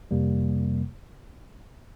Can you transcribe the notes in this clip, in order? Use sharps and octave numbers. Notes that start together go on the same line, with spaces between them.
F2 C3 G3 A#3